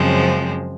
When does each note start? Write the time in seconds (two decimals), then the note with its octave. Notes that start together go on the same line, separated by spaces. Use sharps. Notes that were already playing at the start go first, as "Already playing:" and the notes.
Already playing: F#2 C#3 F3 G#3 C4